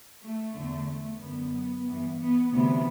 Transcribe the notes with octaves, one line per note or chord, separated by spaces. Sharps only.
A3
E2 D3
A3
F#2 D3 B3
G2 E3
B3
D2 C3 E3 B3